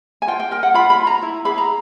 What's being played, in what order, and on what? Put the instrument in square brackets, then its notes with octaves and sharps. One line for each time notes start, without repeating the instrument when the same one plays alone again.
[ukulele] G#5
F4 G5
G5
A#4 G5
F#5
F4 B5
B5
F4
A#5
E4
G#4 B5
A#5